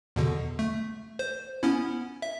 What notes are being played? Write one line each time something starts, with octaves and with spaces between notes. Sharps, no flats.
E2 B2 D3
A3
C5
B3 C#4 E4
E5